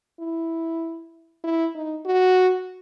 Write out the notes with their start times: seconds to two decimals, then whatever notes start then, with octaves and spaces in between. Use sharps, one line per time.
0.20 E4
1.44 E4
1.75 D#4
2.05 F#4